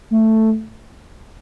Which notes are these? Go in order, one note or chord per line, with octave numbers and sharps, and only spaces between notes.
A3